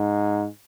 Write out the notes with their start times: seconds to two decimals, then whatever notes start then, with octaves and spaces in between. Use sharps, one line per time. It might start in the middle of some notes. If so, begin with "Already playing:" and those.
Already playing: G#2